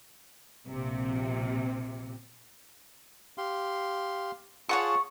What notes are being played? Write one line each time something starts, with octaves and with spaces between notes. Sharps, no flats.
A#1 C3
G4 F5 C6
F4 G#4 C#5 F#5 A5 C#6